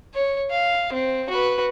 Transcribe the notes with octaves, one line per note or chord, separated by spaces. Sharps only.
C#5
F5
C4
F#4 B4